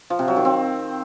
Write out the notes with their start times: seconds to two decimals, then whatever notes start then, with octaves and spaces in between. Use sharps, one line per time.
0.10 F3
0.19 C3
0.28 F#3
0.36 D#3
0.45 C4